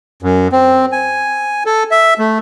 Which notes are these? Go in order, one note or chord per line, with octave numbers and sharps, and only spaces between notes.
F#2
C4
G#5
A4
E5
A3